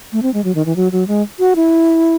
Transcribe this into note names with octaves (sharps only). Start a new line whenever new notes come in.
A3
C4
G#3
F#3
D#3
E3
F#3
F#3
G#3
F#4
E4